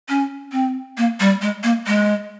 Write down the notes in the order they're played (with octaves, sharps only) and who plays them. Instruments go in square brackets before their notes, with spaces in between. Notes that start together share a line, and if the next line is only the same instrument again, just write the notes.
[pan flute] C#4
C4
A#3
G3
G#3
A#3
G#3